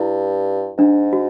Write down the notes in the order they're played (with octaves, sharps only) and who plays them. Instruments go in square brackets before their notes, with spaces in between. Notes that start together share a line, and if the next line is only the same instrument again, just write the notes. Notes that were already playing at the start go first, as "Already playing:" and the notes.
Already playing: [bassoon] G2 [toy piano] E4
[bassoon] G#2 [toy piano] D4
[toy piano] F#4